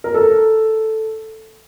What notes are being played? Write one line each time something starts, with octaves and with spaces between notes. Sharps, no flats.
A#4
A4